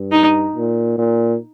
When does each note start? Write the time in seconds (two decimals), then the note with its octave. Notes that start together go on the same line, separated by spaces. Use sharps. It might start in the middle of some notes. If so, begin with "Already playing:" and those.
Already playing: G2
0.12 D#4
0.56 A#2
0.98 A#2